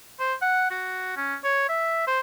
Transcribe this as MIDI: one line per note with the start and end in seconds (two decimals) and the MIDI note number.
0.19 0.34 72
0.42 0.70 78
0.70 1.13 66
1.17 1.35 61
1.44 1.66 73
1.69 2.06 76
2.07 2.20 72